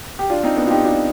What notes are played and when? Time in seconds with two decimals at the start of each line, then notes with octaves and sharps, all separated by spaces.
0.19 G4
0.30 D4 F4
0.43 C4 D#4
0.57 B3 D4
0.66 F4
0.71 D#4 G4
0.85 D4 F4